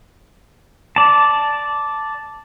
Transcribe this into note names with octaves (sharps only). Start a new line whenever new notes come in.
D5 A5